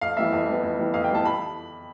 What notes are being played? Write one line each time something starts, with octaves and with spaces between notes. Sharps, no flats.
F2 F5
E3 G3 B3 E5
F2
E3 G3 B3
F2
E3 G3 B3
F2 F5
G5
E3 G3 B3 A5
B5